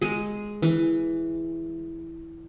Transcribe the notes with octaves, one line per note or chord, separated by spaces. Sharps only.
G#3 G#4
E3